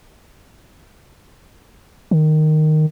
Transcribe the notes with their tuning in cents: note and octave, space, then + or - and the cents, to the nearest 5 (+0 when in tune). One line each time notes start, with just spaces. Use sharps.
D#3 -10